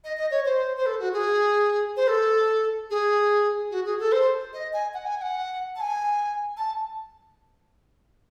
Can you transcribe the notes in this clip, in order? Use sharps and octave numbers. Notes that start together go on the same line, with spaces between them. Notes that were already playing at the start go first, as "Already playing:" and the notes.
D#5
D#5
C#5
C5
C5
A4
F#4
G#4
C5
A4
G#4
F#4
G#4
A4
C5
D#5
G#5
F#5
G#5
G#5
F#5
A5
G#5
A5